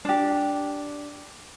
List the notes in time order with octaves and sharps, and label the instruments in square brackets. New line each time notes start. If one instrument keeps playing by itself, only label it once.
[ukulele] D4 G4